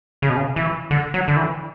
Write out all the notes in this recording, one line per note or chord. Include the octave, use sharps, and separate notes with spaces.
C#3
B2
C#3
E3
D3
F#3
D3
E3